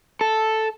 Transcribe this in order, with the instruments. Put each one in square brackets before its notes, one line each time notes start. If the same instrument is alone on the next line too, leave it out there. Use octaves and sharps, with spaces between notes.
[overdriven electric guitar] A4